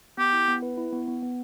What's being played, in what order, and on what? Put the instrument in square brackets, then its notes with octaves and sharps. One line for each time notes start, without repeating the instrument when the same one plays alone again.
[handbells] B3 [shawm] G4
[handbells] E4
B3
B4
E4
B3
B3
B3